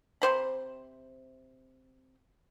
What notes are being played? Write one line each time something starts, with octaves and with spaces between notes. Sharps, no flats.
C3 C4 C5 B5